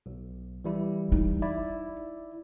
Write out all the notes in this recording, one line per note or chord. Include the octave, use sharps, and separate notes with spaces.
B1
E3 G3 E4
D#4
E4 D5